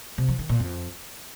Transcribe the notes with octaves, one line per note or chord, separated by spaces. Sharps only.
C3
F3
D#3
A#2
F2